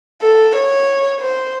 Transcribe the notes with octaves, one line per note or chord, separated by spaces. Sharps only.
A4
C#5
C5